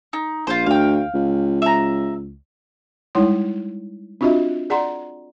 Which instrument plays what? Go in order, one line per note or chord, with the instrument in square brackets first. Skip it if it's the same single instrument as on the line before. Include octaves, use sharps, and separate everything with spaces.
[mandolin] D#4
[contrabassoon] A#1 [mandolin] F4 C5
[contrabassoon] D2 [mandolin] F5 G5
[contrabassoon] C#2
[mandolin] E5 A#5
[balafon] G3 G#3 D#4 E4 C#5 C6
C4 D4 F4 F#4 D#5 E5
G#4 D5 F#5 A#5 C6